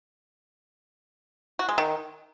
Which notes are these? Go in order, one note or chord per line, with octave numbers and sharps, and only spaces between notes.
F#4
G#3
D#3